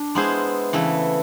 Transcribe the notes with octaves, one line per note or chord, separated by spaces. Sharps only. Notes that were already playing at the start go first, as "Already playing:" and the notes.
Already playing: D4
G#3 B3 E4 G#4 C5
C#3 E3 A3